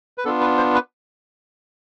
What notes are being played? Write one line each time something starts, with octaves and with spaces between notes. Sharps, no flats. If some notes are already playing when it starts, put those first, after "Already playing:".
B4
B3 D4 F4 A4
B4
C5
B4